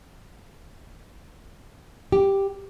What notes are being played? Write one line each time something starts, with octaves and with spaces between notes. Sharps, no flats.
G4